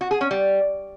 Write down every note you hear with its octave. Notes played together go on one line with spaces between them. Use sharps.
F#4
G#4
C#4
G3